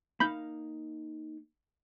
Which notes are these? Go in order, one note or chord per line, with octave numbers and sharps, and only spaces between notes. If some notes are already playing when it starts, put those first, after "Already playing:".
A#3 D#4 F5 B5 G6